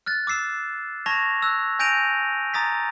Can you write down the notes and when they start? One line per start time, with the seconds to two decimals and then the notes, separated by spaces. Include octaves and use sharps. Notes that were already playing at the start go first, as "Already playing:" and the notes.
0.06 F6 F#6 A6
0.27 D6 E6 C7 E7
1.06 A5 C#6 G#6 A#6 F7
1.42 E6 F#6
1.79 G#5 G6 A#6 D7 D#7 F7
2.54 A#5 D#6 A6 B6